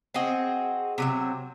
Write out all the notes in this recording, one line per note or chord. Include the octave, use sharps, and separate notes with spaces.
C4 F#4 G#4 D#5
C3 F#3 E5